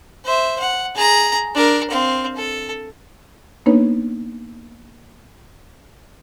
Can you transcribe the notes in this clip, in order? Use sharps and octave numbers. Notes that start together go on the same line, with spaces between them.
C5 E5
F#5
G#4 A#5
D4 A#4
C4 F5
A4
A#3 B3 D4 D#4 B4 C#5